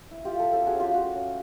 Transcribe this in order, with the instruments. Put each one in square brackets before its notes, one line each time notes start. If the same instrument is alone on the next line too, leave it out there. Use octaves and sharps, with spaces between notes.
[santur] E4
F4 G4
A3
G4 A4
C#4 G4 A4
F#4 G#4
C#4
F4 G4
A3 F#4
C#4